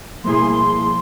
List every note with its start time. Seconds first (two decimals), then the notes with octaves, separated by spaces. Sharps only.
0.24 B2 F3 G3 A3 A#3 E4 G#4 C6